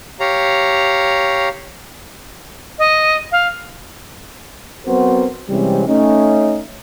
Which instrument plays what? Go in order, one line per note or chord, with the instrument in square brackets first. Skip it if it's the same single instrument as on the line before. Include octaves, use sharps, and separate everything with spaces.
[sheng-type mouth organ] G4 C#5 F5 A#5
[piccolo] D#5
F5
[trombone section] F#3 B3 C4 F#4 A#4 C5
C3 E3 G3 G#3 C4 C#4
A3 C#4 D#4